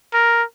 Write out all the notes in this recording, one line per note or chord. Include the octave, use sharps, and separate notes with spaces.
A#4